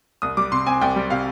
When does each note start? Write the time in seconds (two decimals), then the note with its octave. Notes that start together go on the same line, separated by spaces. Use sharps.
0.22 C2 D#6
0.37 G3 D6
0.52 C3 C6
0.66 C4 G#5
0.81 C2 G5
0.96 G3
1.10 C3 F5